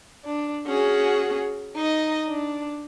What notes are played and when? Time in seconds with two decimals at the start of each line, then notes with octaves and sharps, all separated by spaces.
0.24 D4
0.67 C#4 F#4 G#4
1.76 D#4 D#5
2.28 D4